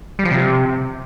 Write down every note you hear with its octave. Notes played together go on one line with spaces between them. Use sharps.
G3
F3
C3